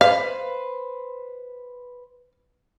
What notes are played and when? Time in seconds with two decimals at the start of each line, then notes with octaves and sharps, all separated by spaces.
0.01 B4 C5 F5